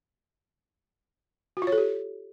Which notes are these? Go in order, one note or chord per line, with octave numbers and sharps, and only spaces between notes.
F#4
F4
C#5
A4
G4